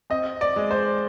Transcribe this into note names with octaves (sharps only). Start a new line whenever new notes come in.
C4 D#5
D5
G#3
C5